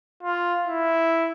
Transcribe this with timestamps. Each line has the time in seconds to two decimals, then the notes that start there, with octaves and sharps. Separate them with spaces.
0.23 F4
0.67 E4